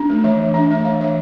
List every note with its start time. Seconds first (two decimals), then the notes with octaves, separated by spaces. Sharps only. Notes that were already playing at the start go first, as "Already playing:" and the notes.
Already playing: D4
0.09 A3
0.24 E3 E5
0.40 E3
0.54 D4 E5
0.70 A3 E5
0.85 E3 F5
1.01 E3 E5